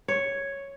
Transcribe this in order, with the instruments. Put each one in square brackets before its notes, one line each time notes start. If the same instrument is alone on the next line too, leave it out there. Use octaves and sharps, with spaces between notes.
[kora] C#5